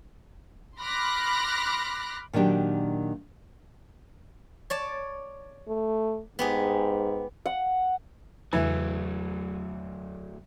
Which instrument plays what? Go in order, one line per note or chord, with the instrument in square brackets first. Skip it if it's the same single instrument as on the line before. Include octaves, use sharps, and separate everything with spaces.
[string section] B5 C6 D6 F6 F#6 A#6
[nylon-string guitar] A#2 D#3 F#3 D4 G4
[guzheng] C#5 D5 A5
[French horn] A3
[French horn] G#2 [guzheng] B3 G4 G#4
[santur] F#5
[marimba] E2 C#3 E5 [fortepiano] E3 [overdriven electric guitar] F#3 A3